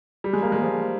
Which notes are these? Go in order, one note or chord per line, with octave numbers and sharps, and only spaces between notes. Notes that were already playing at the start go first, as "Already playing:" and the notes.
G3
G#3
A#3
G#3
F3